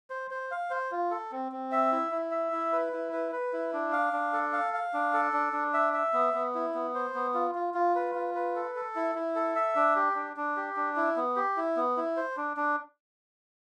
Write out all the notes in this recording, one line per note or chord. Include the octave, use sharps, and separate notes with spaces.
C5
C5
F5
C5
F4
A4
C4
C4
E5
E4
E4
E5
E4
B4
E4
B4
B4
E4
D4
F5
D4
A4
F5
F5
D4
A4
D4
D4
E5
E5
B3
B3
E4
B3
C5
B3
F4
F4
F4
B4
F4
B4
A4
A4
E4
E4
A4
E5
D4
G4
D4
D4
G4
D4
E4
B3
G4
E4
B3
E4
C5
D4
D4